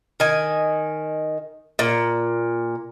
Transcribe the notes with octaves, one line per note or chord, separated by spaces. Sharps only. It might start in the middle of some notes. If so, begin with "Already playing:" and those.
D#3 G#5
A#2